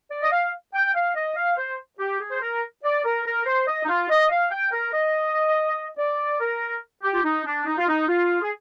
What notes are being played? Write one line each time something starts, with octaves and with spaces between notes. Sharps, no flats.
D5
D#5
F5
G5
F5
D#5
F5
C5
G4
G#4
C5
A#4
D5
A#4
A#4
C5
D#5
D#4
F4
D#5
F5
G5
A#4
D#5
D5
A#4
G4
F4
D#4
D4
D#4
F4
D#4
F4
G#4